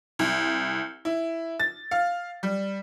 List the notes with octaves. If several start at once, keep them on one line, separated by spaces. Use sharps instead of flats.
C2
E4
A6
F5
G3